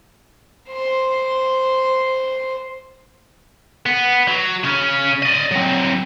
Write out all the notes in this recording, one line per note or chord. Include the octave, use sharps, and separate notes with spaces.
C5 C6
B3
F#3
C#3 C#4
D5 D#5
F#3 C4